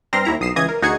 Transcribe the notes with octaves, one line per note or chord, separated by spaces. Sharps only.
G2 C4 A#5 C6 F6 A#6
D#2 E4 A#5
B1 D#6 C7 E7
C#2 E3 D#5 D#6 G#6
A#4
D2 D#4 F#4 G#4 G#6 C#7